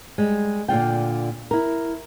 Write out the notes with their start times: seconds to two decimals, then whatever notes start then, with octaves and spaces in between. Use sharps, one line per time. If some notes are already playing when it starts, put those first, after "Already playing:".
0.18 G3 G#3
0.68 A#2 D3 F4 G5
1.51 E4 A#4